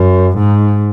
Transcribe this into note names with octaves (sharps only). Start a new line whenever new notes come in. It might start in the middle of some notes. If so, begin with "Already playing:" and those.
Already playing: F#2
G#2